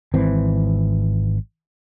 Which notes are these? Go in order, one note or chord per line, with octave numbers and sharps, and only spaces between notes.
G#1 E3 C4